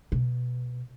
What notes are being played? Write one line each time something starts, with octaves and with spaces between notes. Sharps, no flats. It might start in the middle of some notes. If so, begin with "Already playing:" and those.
B2